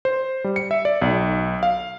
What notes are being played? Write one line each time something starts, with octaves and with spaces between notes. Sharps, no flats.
C5
G3
C#7
E5
D5
B1
F5